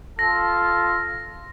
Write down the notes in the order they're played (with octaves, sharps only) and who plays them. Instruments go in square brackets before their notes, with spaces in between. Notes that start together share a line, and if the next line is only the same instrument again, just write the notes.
[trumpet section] F4 A4 [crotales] A#6